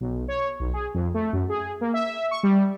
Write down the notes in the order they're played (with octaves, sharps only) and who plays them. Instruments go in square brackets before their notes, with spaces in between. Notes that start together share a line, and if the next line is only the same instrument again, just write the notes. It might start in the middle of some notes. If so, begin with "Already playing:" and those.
[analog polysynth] B1
C#5
B1
G#4
F2
A3
F#2
G#4
A#3
E5
C#6
G3